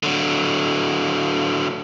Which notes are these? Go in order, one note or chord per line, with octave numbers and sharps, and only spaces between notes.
D3 F#3